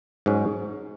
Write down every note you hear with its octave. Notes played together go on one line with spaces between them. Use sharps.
G#2 F#3 C#4